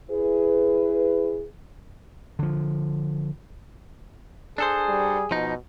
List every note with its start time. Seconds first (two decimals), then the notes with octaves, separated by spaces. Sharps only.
0.10 E4 G#4 B4
2.39 D3 F3
4.58 D4 G#4 A4 C5
4.89 G3
5.31 B2 F3 D#4